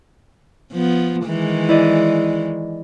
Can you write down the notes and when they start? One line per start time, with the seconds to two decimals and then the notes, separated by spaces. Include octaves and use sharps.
0.73 F3 B3
1.26 D#3 E3 G#3
1.69 E4 D5 D#5